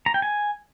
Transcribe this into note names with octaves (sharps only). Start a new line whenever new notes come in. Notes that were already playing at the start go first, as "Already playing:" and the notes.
A#5
G5
G#5